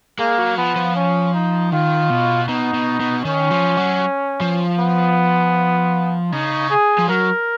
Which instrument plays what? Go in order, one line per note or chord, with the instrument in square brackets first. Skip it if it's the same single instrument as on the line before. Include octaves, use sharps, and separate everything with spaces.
[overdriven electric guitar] G#3 [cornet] A#3
[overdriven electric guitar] F#3
[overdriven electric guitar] F3 [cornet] B3
[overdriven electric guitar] F3
[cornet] C#4
D#4
[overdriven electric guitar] D#3 [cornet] F4
[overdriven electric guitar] B2
[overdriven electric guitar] B2 [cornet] D#4
[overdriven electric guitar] B2
B2
[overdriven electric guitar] D#3 [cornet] C#4
[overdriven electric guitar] F3
F#3
F3
[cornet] B3
[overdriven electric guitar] C#3 [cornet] D#4
[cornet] G#4
[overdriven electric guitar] F3
[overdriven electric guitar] F#3 [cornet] A#4